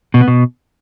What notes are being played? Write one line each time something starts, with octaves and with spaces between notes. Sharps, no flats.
B2
B3
B2